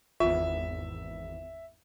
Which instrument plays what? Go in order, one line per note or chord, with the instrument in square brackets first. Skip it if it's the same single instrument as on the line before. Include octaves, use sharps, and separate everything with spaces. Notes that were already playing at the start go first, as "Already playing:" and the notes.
[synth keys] G#1 E2 [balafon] F4 [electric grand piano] E5